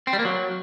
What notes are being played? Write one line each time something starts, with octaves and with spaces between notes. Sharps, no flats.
C4
G3
A#3
F#3